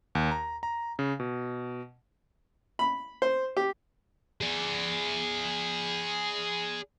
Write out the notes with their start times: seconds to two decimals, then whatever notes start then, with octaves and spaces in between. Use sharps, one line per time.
0.15 D#2
0.31 A#5
0.63 A#5
0.99 C#3
1.20 B2
2.79 B5
3.22 C5
3.57 G4
4.41 G#4 D5